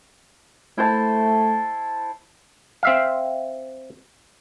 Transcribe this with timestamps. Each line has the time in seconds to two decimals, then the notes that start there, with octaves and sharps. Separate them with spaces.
0.78 A3 E4 C5 A5
2.83 C4 E5 F5